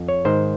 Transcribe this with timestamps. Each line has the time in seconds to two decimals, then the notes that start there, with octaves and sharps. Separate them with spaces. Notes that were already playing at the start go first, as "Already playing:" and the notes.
Already playing: F2
0.09 C#5
0.25 G#2 D#3 C5